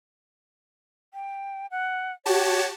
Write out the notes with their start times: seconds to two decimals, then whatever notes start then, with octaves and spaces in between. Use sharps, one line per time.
1.14 G5
1.71 F#5
2.26 F#4 G4 C#5 A5